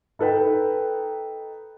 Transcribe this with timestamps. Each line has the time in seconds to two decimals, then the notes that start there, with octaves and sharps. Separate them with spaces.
0.19 D#4 A4 B4 G5